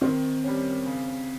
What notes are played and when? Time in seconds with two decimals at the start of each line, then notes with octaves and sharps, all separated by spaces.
0.01 D#3 C4
0.44 G3 C#4
0.86 C#3